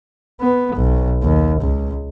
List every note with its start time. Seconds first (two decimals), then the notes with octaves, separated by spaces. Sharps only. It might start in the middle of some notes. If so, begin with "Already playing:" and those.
0.41 B3
0.76 B1
1.23 D#2
1.61 C#2